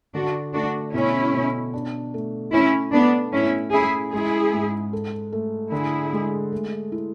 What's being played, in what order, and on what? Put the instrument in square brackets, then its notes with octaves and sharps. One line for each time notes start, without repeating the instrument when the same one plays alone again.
[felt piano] D3 [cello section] D4 F#4
[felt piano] A3 [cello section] D4 F#4
[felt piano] B2 [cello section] C#4 E4
[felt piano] B2
D4
A3
[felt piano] A3 [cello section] C#4 E4
[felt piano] A3 [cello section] B3 D4
[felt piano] A2 [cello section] C#4 E4
[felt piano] C#4 [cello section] E4 G#4
[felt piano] G#3 [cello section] E4 G#4
[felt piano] G#2
A4
A3
[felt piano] D3 [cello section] E4 G#4
[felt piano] G#3
A3
E4